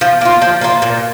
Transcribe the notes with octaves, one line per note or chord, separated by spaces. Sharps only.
F3
A#3 F4
F3
A#3 F4
A#2